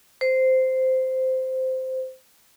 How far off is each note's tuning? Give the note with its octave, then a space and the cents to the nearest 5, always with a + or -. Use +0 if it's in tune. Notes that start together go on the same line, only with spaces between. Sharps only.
C5 -10